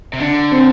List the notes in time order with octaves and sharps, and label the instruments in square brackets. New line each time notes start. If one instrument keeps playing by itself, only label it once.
[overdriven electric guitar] C3
[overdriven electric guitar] D3 [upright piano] D4
[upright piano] C4